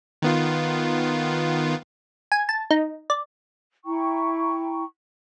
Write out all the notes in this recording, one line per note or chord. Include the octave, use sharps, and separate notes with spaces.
D#3 B3 F4
G#5
A5
D#4
D5
E4 G5 A#5 C#6